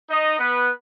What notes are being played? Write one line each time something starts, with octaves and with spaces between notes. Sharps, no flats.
D#4 D#5
B3 B4